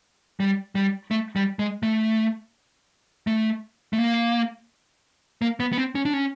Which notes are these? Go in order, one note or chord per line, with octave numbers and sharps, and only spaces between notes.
G3
G3
A3
G3
G#3
A3
A3
A3
A#3
A#3
B3
B3
C4
C#4
D4
C#4